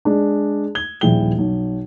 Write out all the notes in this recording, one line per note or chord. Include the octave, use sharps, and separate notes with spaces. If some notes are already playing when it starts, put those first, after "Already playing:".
G#3 D4
G#6 G7
D#1 A#1 E4 G#4 G5 G7
B1